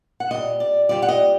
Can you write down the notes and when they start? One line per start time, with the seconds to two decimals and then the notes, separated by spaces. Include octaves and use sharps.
0.20 F#5
0.30 A#2 G3 C4 D#5
0.60 D5
0.89 A#2 G3 C4 D5
1.02 F#5
1.09 D#5